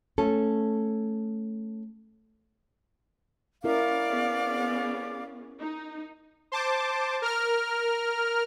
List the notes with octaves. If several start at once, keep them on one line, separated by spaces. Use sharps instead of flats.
A3 C#4 A4
C#4 E4 A#4 D5 E5 F5 D6
B3 C#4 G#4
D#4
C5 A5 D6
A#4 F6